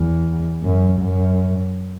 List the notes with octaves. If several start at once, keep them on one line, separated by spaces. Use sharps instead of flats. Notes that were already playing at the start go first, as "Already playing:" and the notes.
Already playing: E2
F#2
F#2